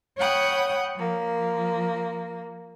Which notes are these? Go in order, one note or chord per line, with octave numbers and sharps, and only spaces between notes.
C#5 F#5 G5 B5 D#6
F3 A#3